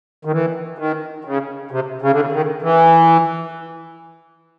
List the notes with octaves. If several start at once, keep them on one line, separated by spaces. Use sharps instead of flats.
D#3
E3
D#3
C#3
C3
C#3
D3
C#3
D#3
E3